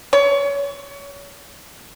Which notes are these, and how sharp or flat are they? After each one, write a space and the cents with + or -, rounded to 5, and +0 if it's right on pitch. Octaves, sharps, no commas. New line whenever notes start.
C#5 +30